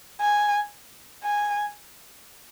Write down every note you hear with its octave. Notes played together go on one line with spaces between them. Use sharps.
G#5
G#5